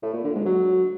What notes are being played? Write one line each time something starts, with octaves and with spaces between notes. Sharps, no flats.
A2
A#2
D3
G#2
F#3